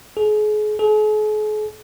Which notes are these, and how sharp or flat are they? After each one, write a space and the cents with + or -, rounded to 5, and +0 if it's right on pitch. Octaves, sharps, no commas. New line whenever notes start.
G#4 +35
G#4 +45